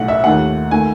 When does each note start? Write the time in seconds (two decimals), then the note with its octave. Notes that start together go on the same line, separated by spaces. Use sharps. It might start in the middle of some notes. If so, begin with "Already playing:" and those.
Already playing: B1 A2 F#5
0.08 E5
0.24 D#2 D#3 A3 F#5
0.71 D#3 A3 G#5